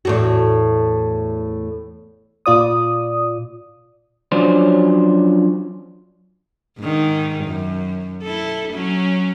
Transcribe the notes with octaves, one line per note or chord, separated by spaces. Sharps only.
E2 A2 F#4
A#2 F4 D5 D#6
F3 F#3 C#4 D4 C5
G#2 D#3
F#2
E4 A4
F#3 C#4